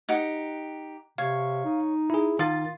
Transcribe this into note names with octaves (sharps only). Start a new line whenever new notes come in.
D#4 G4 F#5
C3 C#5 F5
D#4
E4 G#4
D#3 F4 A#4 A6